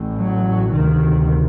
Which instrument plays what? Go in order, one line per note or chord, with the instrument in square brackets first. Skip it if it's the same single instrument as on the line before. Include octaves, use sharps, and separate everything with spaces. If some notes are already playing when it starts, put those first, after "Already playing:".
Already playing: [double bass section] A1 A2
F#3
D2 C3 D#3